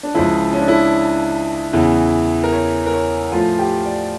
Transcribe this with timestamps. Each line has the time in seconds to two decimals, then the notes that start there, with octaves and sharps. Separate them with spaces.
0.03 D4
0.14 C#2 C#3 F3 E4
0.53 C#4
0.60 D4
0.68 E4
1.73 E2 C#3 E3
2.44 A#4
2.52 C#5
2.86 A#4
2.93 C#5
3.32 A2 F3 F4
3.59 G4
3.85 D5